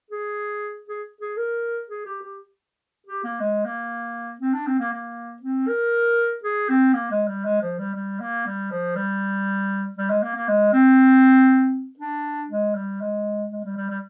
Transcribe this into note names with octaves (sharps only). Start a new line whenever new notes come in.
G#4
G#4
G#4
A#4
G#4
G4
G4
G4
A#3
G#3
A#3
C4
D4
C4
A#3
A#3
C4
A#4
G#4
C4
A#3
G#3
G3
G#3
F3
G3
G3
A#3
G3
F3
G3
G3
G#3
A#3
A#3
G#3
C4
D4
G#3
G3
G#3
G#3
G3
G3
G3